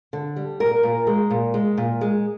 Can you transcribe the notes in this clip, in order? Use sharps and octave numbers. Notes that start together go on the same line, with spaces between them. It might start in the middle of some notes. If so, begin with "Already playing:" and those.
D3
G3
A#2 A#4
A#2
G#3
A#2
G#3
A#2
G#3